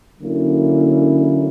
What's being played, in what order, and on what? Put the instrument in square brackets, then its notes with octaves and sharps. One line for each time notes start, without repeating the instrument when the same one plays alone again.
[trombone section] D3 F#3 A#3 C#4 E4